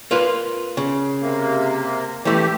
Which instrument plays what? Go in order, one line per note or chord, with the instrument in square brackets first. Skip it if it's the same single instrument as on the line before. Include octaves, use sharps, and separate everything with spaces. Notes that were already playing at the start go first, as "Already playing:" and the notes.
[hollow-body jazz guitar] A#3 F4 B4
C#3
[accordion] C3 A#3
[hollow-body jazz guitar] E3 A3 [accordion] G4